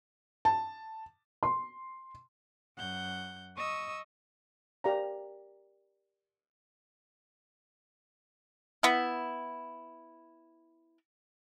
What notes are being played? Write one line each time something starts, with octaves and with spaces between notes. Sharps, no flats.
A5
C6
F#2 F#5 G6
D#5 C#6 D#6 E6
G4 A#4 D5 F5 A#5
B3 E4